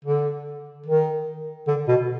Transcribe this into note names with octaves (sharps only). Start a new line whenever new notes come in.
D3
D#3
D3
B2